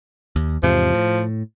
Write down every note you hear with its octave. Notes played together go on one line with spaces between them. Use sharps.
D#2
E2 G#2 C3 F3
A2